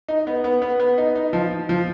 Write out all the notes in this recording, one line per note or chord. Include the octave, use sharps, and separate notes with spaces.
D#4
B3
B3
B3
B3
D#4
D#4
F3
F3